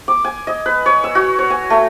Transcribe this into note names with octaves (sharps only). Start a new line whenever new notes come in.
D6
G#5
D#5
B4
C#5
E6
F#4
C#5
G#5
A3